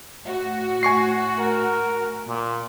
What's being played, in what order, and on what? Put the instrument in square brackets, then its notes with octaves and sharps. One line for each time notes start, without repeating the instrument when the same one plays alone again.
[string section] A2 F#4
[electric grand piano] G#5 C#6 C7
[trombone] A#4
A#2